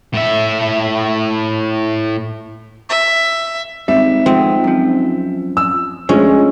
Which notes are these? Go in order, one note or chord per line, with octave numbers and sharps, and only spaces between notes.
A2 E5
E5
G#1 G3 E5
F3 G#3 B3 C4
F#2 F3
E6
D2 F3 G#3 C#4